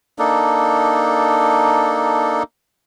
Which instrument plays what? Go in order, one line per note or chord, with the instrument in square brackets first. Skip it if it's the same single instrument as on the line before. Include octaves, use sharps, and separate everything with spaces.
[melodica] A#3 D4 D#4 A4